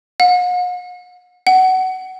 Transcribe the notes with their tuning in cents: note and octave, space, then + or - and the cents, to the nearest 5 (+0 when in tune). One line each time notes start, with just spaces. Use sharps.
F#5 -45
F#5 +20